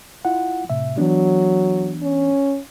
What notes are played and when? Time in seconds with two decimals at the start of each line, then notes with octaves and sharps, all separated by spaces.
0.25 E4 F4 F#5
0.70 A2 C3 E5
0.98 E3 F#3 B3 D4
2.02 C#4